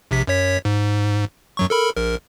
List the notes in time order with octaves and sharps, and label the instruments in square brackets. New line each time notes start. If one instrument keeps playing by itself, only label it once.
[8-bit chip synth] A#1 C3 B6
F#2 C#5 B6
G#2
F#2 F#3 C#6
A4 A#4 B5
A#1 A#4